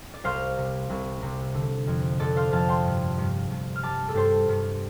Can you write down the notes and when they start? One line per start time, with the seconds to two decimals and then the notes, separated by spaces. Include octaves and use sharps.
0.14 D5
0.24 C2 C5 F5
0.57 C3
0.89 C2
1.22 C3
1.54 D3
1.87 F2
2.20 F2 A4 D5
2.37 C5 F5
2.53 F2 F5 A5
2.69 G5 C6
2.85 G2
3.18 G2
3.51 G2
3.75 F6
3.83 G3 A5 D6
4.09 A4
4.14 G2 G4 C5
4.49 G2